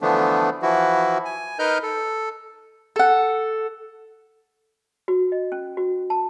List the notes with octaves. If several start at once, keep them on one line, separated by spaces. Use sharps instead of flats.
D3 E3 F3 A3 B3 D4
E3 F3 E4 F#4
G#5
D#4 A#4 B4 D#5 F6 G6
A4
A4 F#5
F#4
D#5
C#4
F#4
A5